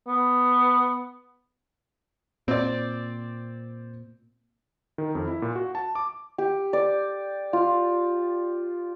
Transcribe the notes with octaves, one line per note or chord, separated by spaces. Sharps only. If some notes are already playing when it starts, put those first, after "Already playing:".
B3
A#2 C4 D5
D#3
F2
E4
A#2
F#4
A5
D6
G4
D5
F4